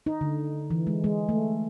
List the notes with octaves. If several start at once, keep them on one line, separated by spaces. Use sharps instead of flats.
D#4
D3
E3
G#3
G#3
A3